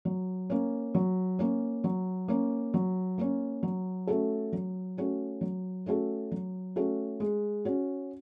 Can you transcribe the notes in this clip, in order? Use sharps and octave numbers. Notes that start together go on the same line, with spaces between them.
F#3
A#3 C#4
F#3
A#3 C#4
F#3
A#3 C#4
F#3
A#3 C#4
F#3
A3 C#4 F#4 A4
F#3
A3 C#4 F#4 A4
F#3
A3 C#4 F#4 A4
F#3
A3 C#4 F#4 A4
G#3
C#4 F#4